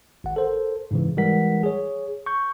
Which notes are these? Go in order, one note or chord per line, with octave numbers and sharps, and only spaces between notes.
G#1 F#5
A4 A#4 C5
G#2 C#3 E3
E3 G3 G#3 A#4 F#5 B6
G#4 C#5
C#6 G6